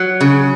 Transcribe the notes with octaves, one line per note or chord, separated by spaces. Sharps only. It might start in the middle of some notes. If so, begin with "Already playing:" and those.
Already playing: F#3
C#3